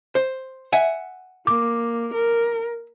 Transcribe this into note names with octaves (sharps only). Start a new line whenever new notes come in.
C5
E5 F#5 G#5
A#3 D6
A#4